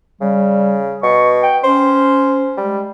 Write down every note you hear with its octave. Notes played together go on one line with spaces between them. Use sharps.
C#3 G3
B2 C#6
G5
C#4 C5
G3 G#3